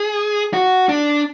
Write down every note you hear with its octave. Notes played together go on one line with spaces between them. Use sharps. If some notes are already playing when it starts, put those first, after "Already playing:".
Already playing: G#4
F#4
D4